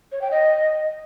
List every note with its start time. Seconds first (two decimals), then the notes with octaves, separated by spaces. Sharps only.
0.12 C#5
0.21 G5
0.31 D#5